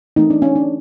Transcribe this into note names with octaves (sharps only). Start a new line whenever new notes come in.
E3 A3 C4 D#4
D4
C#4
D4